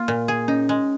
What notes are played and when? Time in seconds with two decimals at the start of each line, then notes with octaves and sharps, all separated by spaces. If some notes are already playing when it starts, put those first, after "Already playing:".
Already playing: A#3 F4
0.08 A#2
0.28 G#4
0.48 C#4 D#4
0.69 G#3